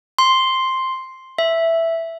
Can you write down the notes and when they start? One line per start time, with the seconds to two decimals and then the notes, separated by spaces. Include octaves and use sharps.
0.19 C6
1.38 E5